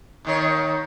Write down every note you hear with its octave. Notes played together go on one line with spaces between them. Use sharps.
D#2 D#3 C#5